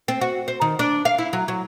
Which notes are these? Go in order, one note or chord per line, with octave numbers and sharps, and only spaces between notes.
C4
F#4
C5
D#3
D4
F5
E4
F#3
F#3